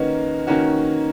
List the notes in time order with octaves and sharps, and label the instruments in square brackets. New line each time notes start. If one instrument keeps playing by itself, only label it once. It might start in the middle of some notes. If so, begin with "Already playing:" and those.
Already playing: [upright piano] D#3 A#3 C#4 F#4 [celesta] B4 D#5
[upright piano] D#3 A#3 C#4 F#4